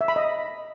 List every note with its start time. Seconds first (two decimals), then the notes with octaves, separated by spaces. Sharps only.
0.01 E5
0.08 B5
0.16 D#5